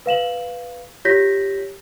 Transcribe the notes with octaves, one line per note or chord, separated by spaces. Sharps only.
B4 F5 E7 F#7
F4 G4 C#5 G6 A#6 B6